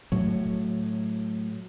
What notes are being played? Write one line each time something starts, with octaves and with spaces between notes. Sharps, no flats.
A2 F#3